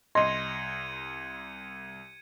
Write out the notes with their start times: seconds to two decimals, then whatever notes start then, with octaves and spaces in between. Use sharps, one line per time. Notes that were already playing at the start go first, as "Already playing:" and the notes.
0.15 C2 D#5 C6 G#6 A#6 C#7 D#7